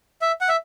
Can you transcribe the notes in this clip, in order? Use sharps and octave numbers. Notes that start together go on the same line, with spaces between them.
E5
F#5
E5